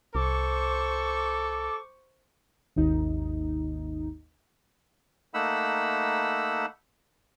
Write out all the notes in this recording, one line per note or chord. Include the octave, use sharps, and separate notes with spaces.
C2 A4 C5 C#6 D6
G#1 D#2 D#4
A3 A#3 D#4 F#5 B5 E6